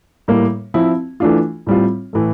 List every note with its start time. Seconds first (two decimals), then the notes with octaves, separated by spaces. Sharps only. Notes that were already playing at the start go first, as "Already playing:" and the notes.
0.28 A2 G3 A#3
0.74 F3 C4 E4
1.20 E3 A3 D4 F4
1.67 A2 G3 C4 F4
2.13 A2 E3 A3